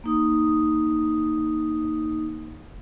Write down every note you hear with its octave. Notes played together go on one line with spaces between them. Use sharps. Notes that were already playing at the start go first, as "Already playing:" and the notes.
A#3 D#4 D#6